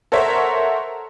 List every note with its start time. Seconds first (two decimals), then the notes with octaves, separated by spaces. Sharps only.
0.12 A4 A#4 C5 C#5 E5 F#5